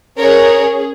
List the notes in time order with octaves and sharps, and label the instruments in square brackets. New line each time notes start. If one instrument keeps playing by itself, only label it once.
[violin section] C#4 G#4 A#4 C#5